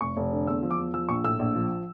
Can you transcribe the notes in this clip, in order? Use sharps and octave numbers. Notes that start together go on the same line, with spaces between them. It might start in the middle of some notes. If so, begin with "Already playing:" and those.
F1 C#6
F1
D3
E2 E6
F3
D6
E2
F3 E6
A#1 C#6
A2 E6
A#1
F3